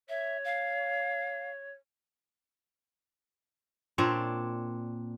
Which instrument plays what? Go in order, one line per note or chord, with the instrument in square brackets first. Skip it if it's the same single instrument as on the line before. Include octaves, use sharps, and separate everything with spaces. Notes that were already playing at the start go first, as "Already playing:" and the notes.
[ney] C#5 [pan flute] E5
[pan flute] F5
[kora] A#2 C4 D4 C#5